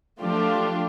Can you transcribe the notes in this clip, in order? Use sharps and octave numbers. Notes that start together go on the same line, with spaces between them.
F3 A3 D4 F4 G4